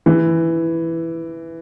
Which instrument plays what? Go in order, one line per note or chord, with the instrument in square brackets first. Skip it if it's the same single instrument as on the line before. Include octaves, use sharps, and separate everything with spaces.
[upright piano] E3